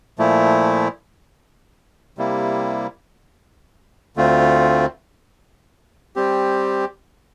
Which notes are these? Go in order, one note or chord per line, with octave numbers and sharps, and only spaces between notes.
A#2 F3 A3 E4
C3 G3 A#3 E4
D2 D3 A3 C4 F4
G3 C4 G4